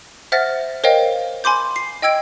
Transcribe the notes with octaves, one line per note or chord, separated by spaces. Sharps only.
C5 E5 F#5 F6 A6 A#6
A#4 C5 C#5 D#5 F5 G5
G#5 B5 C6 D6 G6
C7
D#5 G5 E6 G#6 D7